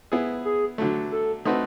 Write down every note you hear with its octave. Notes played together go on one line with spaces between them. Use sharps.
B3 E4 G#4
G#4
D3 F#3 A3
A4
A3 C4 D#4 F#4 B4